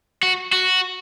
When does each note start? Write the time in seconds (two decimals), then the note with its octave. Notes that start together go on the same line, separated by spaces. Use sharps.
0.23 F#4
0.52 F#4